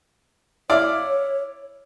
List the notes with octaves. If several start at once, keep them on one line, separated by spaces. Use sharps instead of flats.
E4 C#5 D5 F5